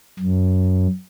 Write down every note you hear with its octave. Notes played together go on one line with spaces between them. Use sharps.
F#2